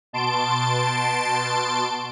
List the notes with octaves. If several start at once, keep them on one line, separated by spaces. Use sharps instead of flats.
B2 A5 C6 D7